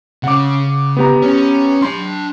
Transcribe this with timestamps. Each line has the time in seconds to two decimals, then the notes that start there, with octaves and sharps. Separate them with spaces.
0.24 C#3 F#5 D6
0.97 B3 G4 A#5
1.22 C#4
1.82 D4 B5 C6